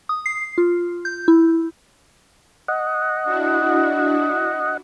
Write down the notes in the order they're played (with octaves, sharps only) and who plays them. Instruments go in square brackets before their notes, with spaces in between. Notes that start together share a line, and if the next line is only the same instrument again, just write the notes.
[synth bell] D#6
C7
F4
G6
E4
[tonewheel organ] D#5 F#5
[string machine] D4 E4 F#4